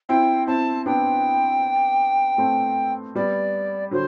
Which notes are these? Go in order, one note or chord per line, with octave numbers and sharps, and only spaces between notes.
C4 E4 G5
C4 E4 A5
B3 D4 G5
A3 C4
G3 B3 D5
D3 F#3 C5